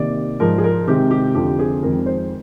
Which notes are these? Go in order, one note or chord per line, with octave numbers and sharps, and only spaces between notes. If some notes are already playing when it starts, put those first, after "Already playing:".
Already playing: C3 D#3 A#3 D5
G#2 F3 G#3 A#4
G#4
A#4
C3 D#3 G#3 C4 G4
G4
F2 D3 F3 C4 G4
G#4
F2 D#3 G#3 C4 A#4
C5